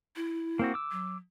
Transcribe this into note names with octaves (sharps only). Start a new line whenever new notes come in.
E4
A#3 C4 F#4
D6 E6
F#3